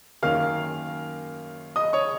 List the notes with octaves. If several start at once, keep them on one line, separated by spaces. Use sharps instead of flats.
F#2 D#3 A#3 C#4 F5 F6
D#5 D#6
C#5 C#6